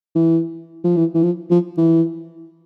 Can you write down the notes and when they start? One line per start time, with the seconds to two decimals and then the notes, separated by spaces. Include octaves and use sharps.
0.15 E3
0.84 F3
0.97 E3
1.14 E3
1.23 F3
1.50 F3
1.78 E3